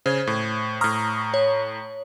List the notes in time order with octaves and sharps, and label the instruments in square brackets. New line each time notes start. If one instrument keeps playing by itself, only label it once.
[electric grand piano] C#3 G#6 [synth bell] C5
[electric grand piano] A2
[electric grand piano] A2 A#5 [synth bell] C#6 D#6 F6
[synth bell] C#5